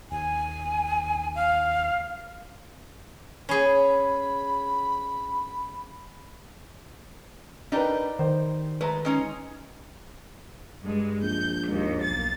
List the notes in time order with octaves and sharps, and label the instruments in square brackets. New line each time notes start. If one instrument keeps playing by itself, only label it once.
[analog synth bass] D#2 [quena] G#5
[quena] F5
[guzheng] C#4 G#4 [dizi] B5
[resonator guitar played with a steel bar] G3 D#4 G4 [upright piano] D4 A#4 B4
[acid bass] D#3 [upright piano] C5
[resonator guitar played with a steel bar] G#3 A3 [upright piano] B4 A#5
[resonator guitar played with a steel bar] G#3 C#4 D#4
[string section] G2 G#3
[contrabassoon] A#1 [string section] G6
[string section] D#2 G#2
B1 A#3 A6